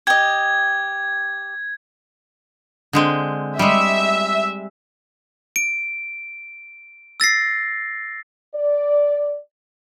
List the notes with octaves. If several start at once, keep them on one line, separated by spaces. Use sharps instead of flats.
G4 D#5 G#6
D3 G#3 C4
G3 G#3 E5
D7
E6 A6 A#6 C7
D5